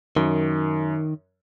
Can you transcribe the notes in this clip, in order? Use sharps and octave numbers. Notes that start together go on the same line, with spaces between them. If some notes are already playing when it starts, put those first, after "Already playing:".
F#2 D#3